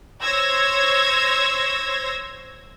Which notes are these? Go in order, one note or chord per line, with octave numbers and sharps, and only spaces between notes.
C5 C#5 E6 G#6 A#6